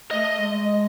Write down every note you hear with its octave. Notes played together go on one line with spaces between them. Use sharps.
A3 D#5
G#3